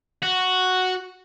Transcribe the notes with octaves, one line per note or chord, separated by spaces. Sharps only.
F#4